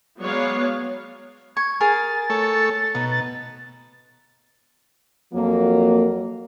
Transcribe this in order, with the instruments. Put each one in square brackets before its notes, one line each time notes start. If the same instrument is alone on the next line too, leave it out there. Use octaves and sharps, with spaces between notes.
[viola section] F#3 G#3 B3 C#5 D5 F5
[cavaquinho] C#6 [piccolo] G#6
[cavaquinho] G#4 A#4 G#5 [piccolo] A6
[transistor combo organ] A3 A4 C#5
[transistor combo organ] B2 [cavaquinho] D#4
[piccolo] A6
[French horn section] F2 F3 F#3 A#3